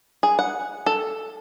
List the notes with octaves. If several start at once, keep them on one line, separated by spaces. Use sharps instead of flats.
G#4
F#5
A4